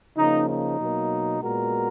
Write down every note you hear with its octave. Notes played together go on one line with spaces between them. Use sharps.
C#3 F3 A#3 D#4
D#4
B2 F#3 A#3
A#2 G#3 B3 F#4 A#4